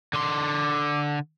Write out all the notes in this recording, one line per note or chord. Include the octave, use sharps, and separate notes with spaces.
D3 C6 D6